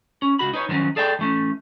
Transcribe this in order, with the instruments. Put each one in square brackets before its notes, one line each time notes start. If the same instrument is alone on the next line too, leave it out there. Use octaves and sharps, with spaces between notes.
[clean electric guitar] C#4
C#2 F#4 B5
D#4 B4 C#5
D#3 F3 F#3 C#4
G#4 A4 D5 E5 G5
E3 A3 C#4